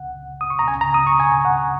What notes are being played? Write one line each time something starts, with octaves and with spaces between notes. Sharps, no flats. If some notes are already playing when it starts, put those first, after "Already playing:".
Already playing: C#2 C#3 F#5
D#6
C#6
A#5
C#2 C#3 G#5
A#5
D#6
C#6
G#5
F#5